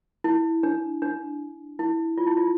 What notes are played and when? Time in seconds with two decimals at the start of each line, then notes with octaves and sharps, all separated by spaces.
0.24 E4
0.63 D4
1.02 D4
1.79 E4
2.18 F4
2.27 E4
2.37 F4